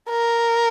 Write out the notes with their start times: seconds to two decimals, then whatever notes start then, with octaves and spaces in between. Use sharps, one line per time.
0.10 A#4